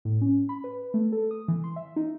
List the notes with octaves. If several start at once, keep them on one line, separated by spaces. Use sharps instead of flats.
A2
C#4
B5
B4
A3
A4
D#6
E3
C6
E5
D#4